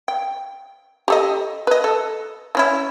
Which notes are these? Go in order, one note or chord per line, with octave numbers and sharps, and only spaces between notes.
G5
G4 A4 D#5
B4 D#5
A4
E3 C#4 E4